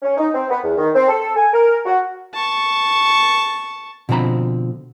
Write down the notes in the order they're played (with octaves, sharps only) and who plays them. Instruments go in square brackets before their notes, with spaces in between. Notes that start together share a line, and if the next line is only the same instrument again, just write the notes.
[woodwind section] C#4
D#4
C4
B3
E2
D#3
C4
A4
G#5
A#4
F#4
[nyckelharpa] A5 C#6
[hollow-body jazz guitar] B2 D3 F3 C4 A#5 B5